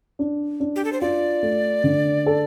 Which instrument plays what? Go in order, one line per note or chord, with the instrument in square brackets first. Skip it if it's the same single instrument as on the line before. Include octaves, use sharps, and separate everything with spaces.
[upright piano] D4
D4
[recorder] G4
A4
C5
[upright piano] F4 [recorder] D5
[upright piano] A3
D3
A4